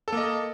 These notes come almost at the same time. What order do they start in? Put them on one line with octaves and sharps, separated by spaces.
A4 A#3 D#5